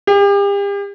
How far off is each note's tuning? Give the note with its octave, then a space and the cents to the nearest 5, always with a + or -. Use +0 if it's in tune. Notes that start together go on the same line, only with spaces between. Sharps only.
G4 +40